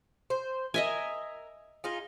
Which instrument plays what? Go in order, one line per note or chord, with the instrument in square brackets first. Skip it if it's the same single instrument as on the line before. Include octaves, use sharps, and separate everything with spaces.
[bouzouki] C5
[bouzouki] A#4 [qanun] D#5 E5 G#5
[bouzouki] D#4 F4 G#4